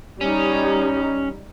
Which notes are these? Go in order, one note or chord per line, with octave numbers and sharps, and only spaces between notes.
G3 C#4 D#4